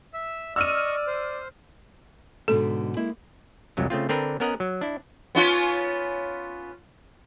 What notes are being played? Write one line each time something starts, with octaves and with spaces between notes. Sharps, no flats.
E5 E6
D5 D#5 C#6 E6 F6 D#7
C5
G#2 B2 D3 A4
G#3 A#3 E4
C2 F2 F#3 G#3
C#3 A3 C4 F4
D3 C4 D4 A#4 B4
B3 C#4 A#4 D#5 F#5
F#3
D4 E4
B3 C#4 F4